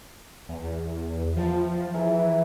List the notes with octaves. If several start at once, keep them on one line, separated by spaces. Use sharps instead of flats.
E2
F3 G5 A5 B5
E3 G#4 A#4 E5